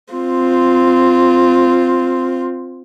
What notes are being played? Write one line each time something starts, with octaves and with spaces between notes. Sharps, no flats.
C4 F4